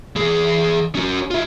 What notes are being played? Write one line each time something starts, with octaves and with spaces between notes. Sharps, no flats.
E3 G#4
C#4 F#4
F4 E5